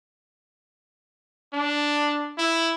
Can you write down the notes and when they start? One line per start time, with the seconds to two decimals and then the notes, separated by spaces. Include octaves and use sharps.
1.53 D4
2.38 E4